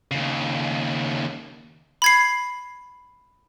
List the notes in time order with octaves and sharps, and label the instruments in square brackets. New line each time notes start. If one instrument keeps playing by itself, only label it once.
[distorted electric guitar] D#2 C#3
[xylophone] B5 G#6 C7